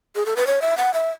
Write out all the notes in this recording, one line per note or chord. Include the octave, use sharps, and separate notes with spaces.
G#4
A4
B4
C#5
E5
F#5
E5